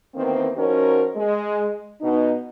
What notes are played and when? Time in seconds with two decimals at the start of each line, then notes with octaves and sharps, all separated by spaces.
0.15 E2 D#3 A#3 C4
0.57 F3 C#4 D#4 F#4 A#4
1.16 G#3
2.01 B2 D#4